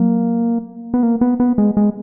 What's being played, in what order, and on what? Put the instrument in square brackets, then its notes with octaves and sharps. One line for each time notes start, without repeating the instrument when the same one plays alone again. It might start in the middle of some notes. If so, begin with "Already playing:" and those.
Already playing: [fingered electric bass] F#3 [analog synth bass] A#3
[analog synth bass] B3
A#3
B3
B3
G#3
G#3